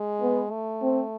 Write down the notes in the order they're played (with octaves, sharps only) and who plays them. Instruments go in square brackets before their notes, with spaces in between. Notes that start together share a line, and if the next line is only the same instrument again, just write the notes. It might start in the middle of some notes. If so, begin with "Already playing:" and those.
Already playing: [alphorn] G#3
[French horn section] B3
[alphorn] A3
[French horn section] C4